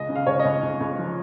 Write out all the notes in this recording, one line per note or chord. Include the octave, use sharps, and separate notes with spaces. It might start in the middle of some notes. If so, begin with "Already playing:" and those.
Already playing: C#2 D#5
C#3
F5
C#2 C#5
D#5
C#2
C#2
C#2
F3